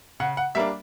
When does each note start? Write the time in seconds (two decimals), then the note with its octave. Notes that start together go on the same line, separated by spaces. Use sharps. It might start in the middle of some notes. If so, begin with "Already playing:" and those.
0.20 C#3 F#5
0.37 F#5
0.55 G3 A#3 D4 E5